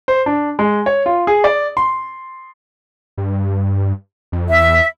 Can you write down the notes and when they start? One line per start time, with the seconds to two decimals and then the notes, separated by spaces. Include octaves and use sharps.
0.08 C5
0.26 D4
0.59 G#3
0.86 C#5
1.06 F4
1.27 G#4
1.44 D5
1.77 C6
3.18 G2
4.32 F2
4.49 E2 E5